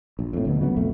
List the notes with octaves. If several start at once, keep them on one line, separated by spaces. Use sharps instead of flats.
A#1
F2 A2
G1 D2 B2
C#3 F#3 G#3 B3
B1 F2 A3